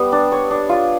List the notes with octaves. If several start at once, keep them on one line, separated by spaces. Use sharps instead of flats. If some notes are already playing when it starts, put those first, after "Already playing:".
Already playing: G3 B3
D4
C#5
D4
F4